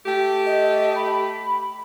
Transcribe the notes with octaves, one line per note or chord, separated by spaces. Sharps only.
A3 G4
D#5
B5